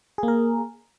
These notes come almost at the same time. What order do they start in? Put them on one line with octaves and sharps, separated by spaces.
G#4 A#3 A#4